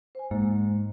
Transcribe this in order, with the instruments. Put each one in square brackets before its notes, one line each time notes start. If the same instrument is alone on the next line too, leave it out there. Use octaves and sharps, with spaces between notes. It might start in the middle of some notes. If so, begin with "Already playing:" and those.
[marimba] C5 G#5
[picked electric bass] G#2 [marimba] A#3